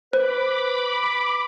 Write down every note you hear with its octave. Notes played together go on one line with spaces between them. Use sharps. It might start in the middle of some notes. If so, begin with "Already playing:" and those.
B4 C5 B5 D6